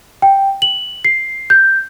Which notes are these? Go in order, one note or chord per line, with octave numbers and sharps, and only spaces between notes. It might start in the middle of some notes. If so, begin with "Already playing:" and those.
G5
F#7
C7
G6